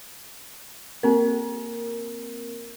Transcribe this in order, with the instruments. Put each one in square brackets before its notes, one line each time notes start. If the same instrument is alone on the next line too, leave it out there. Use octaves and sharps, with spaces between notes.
[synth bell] A#3 C4 A#4